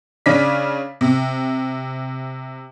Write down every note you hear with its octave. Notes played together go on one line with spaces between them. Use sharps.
C#3 C#4 D4 D6 B6
C3